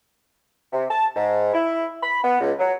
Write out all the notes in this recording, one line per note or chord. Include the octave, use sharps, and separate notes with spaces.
C3
A5
G#2
E4
B5
B3
C#2
F#3